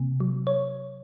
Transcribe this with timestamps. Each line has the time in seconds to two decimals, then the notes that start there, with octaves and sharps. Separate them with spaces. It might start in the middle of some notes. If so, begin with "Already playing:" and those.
Already playing: C3 A#3
0.20 F#3
0.47 C#5